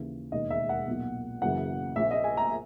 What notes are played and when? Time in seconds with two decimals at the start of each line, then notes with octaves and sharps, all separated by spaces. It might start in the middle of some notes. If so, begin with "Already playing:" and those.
Already playing: D#2 C#3 E3
0.32 E1 D#2 D#3 D#5
0.50 E5
0.69 F#5
0.87 B1 A#2
1.42 F#1 F#2 C#3 E3 F#5
1.96 A#1 A#2 E5
2.11 D#5
2.24 G#5
2.37 A#5